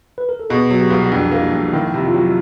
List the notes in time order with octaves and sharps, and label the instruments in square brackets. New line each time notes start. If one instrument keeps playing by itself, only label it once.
[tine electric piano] B4
A#4
A4
[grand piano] B2 [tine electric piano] G#4
[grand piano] F#3 [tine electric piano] F#4
[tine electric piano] G4
[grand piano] C2
[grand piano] F2 [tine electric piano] D4
[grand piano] A#3
[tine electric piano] E4
[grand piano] F2
[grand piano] D#3 [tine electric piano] E4
[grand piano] C3 [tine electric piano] E4
[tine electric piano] F4
[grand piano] F#3